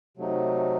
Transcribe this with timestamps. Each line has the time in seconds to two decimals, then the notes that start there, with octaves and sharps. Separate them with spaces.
0.17 C3 F#3 A3 D#4